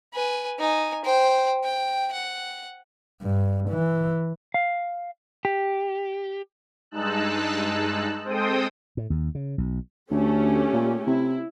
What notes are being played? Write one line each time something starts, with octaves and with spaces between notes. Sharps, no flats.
B4 G#5
D#4 G#5
C5 G5
G5
F#5
G2
E3
F5
G4
G2 G#3 D#4 A5 E6 F#6
G#3 C4 A4 C5 G5 D#6
A2
D#2
C#3
B1
D2 A3 C#4 G4
A#2
C3 E4